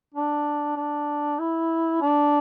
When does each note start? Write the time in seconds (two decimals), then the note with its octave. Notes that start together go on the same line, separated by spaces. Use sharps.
0.14 D4
0.76 D4
1.39 E4
2.01 D4